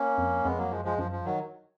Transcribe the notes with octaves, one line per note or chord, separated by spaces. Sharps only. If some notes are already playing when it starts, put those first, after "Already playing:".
Already playing: A#3 C#4
F2
F2 G#3 B3
F#3 A#3
F#2 F3 G#3
F3 G#3
F#2 F3
F3
D#3 F#3